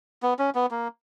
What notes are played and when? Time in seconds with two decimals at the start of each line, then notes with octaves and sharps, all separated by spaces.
0.22 B3
0.39 C#4
0.55 B3
0.71 A#3